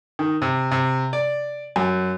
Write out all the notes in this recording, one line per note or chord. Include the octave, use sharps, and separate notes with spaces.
D#3
C3
C3
D5
F#2